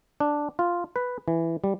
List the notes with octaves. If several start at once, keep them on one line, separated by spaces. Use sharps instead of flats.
D4
F4
B4
E3
G3